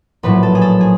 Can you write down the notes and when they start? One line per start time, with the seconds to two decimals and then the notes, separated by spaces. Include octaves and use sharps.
0.23 A#1 A2 F#3 B4
0.43 A4
0.55 G#4
0.62 A4
0.81 G#4